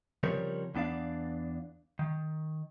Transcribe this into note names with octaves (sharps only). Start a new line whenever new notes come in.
C#3 F3 G3 C4 A#4 C#5
E2 B3 D4 D5 F5
D#3